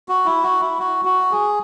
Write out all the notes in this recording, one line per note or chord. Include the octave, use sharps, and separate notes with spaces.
F#4
E4
F#4
E4
F#4
F#4
G#4